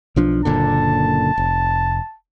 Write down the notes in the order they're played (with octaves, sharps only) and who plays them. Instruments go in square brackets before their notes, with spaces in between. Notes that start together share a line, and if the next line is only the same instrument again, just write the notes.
[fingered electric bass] B1 F3 D4
[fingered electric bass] F#1 A#2 D3 [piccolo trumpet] A5
[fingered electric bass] F1